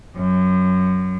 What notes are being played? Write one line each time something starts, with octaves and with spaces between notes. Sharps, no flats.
F#2